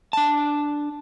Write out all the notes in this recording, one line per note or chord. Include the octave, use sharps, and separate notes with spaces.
D4 A5